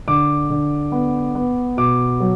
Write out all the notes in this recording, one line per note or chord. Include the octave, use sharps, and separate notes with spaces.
D3 D6
D3
B3
B3
B2 D6
F#3